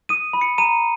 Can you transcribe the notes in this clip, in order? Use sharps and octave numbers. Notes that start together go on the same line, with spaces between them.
D#6 D#7
B5
C#7
A#5 D#7